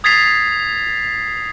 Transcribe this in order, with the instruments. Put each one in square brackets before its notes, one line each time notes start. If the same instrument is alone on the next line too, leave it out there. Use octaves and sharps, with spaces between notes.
[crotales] D#6 G#6 A6 B6 C7 F7